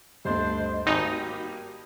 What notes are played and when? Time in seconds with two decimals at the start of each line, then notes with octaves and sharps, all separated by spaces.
0.25 D2 G2 D4 C5 D#5
0.86 G#1 G3 A#3 D#4 F#4 A5 B5